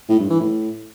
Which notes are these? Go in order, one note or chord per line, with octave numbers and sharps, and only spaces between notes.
A2
G2
E3
A2